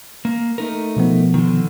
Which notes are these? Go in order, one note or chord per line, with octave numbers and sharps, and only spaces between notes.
A#3
A3 D#4 A#4
B2 F3 B3
D3 D#3